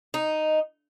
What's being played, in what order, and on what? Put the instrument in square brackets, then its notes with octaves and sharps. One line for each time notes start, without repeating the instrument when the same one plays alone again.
[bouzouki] D#4